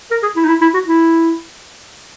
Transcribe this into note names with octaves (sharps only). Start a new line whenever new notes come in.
A#4
G#4
E4
D#4
E4
E4
F#4
E4